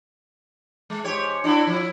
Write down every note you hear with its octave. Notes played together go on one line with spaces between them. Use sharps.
G#3
G#2 G4 C#5
D4 E4 F#4
F3 E4